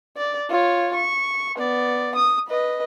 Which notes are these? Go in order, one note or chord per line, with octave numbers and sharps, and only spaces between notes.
D5
F4 C#5
C#6
B3 D5
D#6
B4 D#5